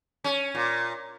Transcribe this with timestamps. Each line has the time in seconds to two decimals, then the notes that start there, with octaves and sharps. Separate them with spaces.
0.24 C#4
0.55 A#2